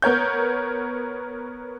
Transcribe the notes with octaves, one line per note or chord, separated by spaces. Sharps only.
B3 A#4 C#5 G6